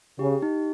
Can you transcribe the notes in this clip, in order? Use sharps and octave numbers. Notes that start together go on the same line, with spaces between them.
C#3 G4
D#4